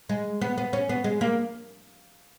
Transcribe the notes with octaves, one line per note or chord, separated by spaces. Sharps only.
G#3
B3
B3
C#4
B3
G#3
A#3